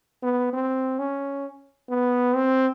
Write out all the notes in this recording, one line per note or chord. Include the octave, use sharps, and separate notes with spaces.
B3
C4
C#4
B3
C4